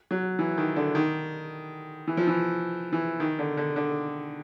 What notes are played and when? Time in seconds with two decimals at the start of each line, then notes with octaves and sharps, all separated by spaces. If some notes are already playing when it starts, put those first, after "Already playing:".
0.11 F#3
0.39 E3
0.57 D#3
0.76 D3
0.95 D#3
2.07 E3
2.17 F3
2.27 E3
2.92 E3
3.20 D#3
3.39 D3
3.57 D3
3.76 D3